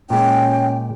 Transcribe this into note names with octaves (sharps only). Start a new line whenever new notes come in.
A#2 G#3 C#4 G5